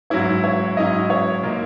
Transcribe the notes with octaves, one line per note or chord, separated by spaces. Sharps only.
G#2 F#3 C#4 E4 C#5
C#5
G#2 F#3 C#4 E4 D#5
C#5
A#2 A#3 D#4